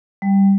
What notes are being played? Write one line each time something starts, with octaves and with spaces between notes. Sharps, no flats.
G3